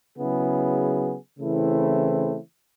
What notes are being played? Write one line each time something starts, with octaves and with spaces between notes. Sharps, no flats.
C#3 F#3 B3 E4 G#4
C#3 E3 A3 C4 E4